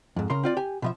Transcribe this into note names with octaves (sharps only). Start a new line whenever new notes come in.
F2 G#2
C#3 A#4 C6
C4 F4 D5
G4 G#5
B2 F3 E5